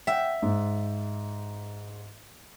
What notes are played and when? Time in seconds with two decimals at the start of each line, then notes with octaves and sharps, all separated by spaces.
0.07 E5 F#5 G5
0.42 G#2